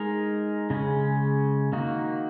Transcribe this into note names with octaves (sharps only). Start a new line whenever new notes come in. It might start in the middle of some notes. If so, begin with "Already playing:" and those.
Already playing: G#3 D#4 A#4
C#3 G#3 C#4
D#3 A#3 D#4 F#4